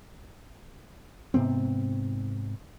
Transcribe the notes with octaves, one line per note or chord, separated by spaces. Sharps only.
G#2 C3 B3 C4